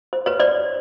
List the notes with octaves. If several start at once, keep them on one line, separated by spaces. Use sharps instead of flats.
C5
B4 C#5
C5 D5